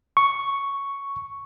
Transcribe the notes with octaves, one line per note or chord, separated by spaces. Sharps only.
C#6